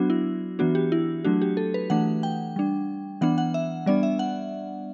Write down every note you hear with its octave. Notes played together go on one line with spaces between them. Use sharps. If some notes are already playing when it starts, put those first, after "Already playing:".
Already playing: F#3 B3 D4 F#4
E4
E3 B3 D4 F#4
G4
E4
F#3 A3 D4 F#4
G4
A4
B4
E3 A3 D4 F#5
G5
G3 D4
E3 B3 D4 F#5
F#5
E5
G3 B3 D4 D5
E5
F#5